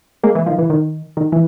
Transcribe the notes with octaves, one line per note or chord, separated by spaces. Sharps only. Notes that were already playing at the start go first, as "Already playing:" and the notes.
G#3 A#3
E3
D#3 F3
E3
D#3
D#3
E3